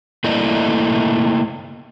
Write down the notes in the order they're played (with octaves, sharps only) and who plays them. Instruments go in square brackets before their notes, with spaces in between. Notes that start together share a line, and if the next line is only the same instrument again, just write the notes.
[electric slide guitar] A3 A#3 E4 D5 D#5